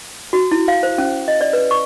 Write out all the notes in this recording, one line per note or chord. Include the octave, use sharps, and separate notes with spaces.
F#4
E4
F5
C5
C#4
D#5
D5
B4
C#6